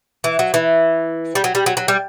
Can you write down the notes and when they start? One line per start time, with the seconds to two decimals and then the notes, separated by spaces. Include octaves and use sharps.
0.24 E3
0.39 F#3
0.54 E3
1.35 G3
1.44 F#3
1.55 G3
1.66 F#3
1.77 F#3
1.88 G3